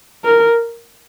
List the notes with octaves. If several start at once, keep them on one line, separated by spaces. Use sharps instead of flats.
A#4